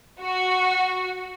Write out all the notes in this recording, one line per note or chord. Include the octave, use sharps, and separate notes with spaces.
F#4